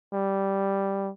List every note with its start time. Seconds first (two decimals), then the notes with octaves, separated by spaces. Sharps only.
0.13 G3